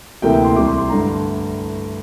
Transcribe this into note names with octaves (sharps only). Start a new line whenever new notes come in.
D2 C3 E3 A#3 G5
C6
C2 C3 E3 D6
C6
C6
G2 D3 A3 A#5